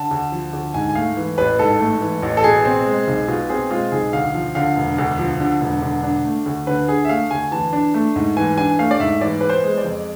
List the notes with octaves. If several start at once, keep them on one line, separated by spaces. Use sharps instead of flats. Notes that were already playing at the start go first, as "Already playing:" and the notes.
Already playing: D3 A5
D2
F3
D2
G#2 G#5
G#5
A3 F5
E3
A1 B4
G#2 A4
A3
E3
A1
A4
B2 G#4
C4
G#3
B1
B2 F4
C4 G#4
G#3 F4
B1 G#4
D2 F5
F3
D3 F5
E1
D2
F3
D3
E1
D3
D4
A3
D2
D3 B4
D4 G#4
E5
A3 F5
D2 G#5
E3 A5
D4
A3
G#2
E3 G#5
D4 G#5
A3 F5
D5
G#2 E5
E3 D5
B3 B4
C5
G#3
D5
F2